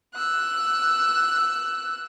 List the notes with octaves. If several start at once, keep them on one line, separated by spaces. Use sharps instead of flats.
E6 F#6